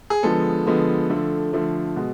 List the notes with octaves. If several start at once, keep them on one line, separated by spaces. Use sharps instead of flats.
G#4
D3 F3 G#3 B3 A4
D3 F3 G#3 B3
D3 F3 A3
D3 F3 A3
B2 G#3